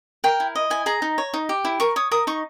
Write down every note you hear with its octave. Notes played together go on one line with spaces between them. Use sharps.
A#4 G5
E4
D#5
E4 G#5
G#4 A#5
D#4
C#5
D#4
G4
E4
A#4 C#6
C#5 D#6
A#4 D#6
D#4 C#6